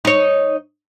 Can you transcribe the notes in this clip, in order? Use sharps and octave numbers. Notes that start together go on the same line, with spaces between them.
D#4 C#5